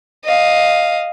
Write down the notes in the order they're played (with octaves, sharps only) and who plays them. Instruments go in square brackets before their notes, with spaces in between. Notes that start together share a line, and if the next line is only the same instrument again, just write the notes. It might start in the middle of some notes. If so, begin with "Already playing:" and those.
[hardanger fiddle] D#5 F5